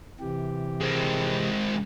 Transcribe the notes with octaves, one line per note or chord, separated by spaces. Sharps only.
C3 E3 G4
G#3 C4